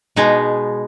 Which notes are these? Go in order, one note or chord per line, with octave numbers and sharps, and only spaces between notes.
B2 G#3 B3 D#4